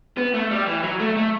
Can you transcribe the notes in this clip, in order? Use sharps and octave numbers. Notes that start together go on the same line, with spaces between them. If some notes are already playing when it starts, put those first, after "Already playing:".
B3
A3
G3
E3
F#3
A3
A3